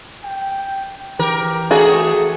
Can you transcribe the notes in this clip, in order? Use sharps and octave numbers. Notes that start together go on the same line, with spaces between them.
G5
E3 G4 A#4
A3 F#4 G#4 G5